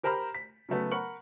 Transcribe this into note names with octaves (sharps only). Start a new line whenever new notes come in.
G4 A#4 C5 A#5 B5 F6
B6
C#3 F#3 A3 B3
A#4 F#5 B5 C#6 F#7